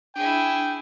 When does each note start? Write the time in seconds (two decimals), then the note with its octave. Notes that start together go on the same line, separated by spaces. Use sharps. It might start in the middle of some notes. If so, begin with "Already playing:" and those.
0.16 D4 E4 G#4 G5